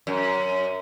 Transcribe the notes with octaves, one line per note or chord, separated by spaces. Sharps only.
F#2